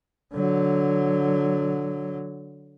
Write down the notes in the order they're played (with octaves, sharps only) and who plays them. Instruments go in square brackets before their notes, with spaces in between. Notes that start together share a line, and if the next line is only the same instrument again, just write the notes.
[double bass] D3 F#3